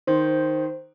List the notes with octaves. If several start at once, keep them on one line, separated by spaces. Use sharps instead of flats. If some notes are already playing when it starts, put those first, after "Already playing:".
D#3 C5